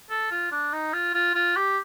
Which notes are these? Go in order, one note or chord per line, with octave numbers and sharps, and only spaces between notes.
A4
F4
D4
D#4
F4
F4
F4
G4